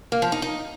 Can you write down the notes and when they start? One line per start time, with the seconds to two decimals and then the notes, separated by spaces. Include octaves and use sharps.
0.12 A#3
0.22 F3
0.32 D#4
0.42 D#4